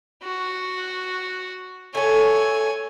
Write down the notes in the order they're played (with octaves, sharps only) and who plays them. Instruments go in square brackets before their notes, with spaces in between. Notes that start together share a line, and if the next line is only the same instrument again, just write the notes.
[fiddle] F#4
[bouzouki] A3 A4 [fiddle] C#5 G#5